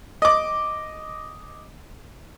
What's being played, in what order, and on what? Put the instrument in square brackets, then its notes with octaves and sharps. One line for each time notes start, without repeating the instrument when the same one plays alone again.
[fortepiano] D#5 D6